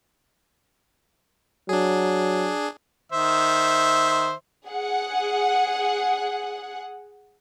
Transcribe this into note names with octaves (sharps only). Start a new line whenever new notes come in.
F#3 D4 G#4
D#3 C5 E5
G#4 F#5